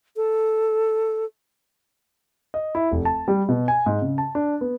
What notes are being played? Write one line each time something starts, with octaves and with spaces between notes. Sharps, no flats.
A4
D#5
E4
F1
A5
G3
B2
G#5
G#2
C#3
A5
D4
B3